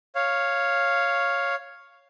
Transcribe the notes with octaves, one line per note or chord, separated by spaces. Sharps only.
C#5 F5